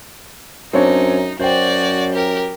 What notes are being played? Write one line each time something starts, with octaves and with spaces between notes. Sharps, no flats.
F#2 C4 D4 D#4 C#5
F#2 F#4 C5 D5 G5
G4 A#4